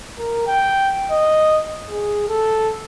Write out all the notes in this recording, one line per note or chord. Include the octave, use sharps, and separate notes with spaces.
A#4
G5
D#5
G#4
A4